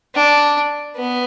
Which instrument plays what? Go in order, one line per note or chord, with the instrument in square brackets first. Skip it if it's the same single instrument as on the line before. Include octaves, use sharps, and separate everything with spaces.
[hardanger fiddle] D4
B3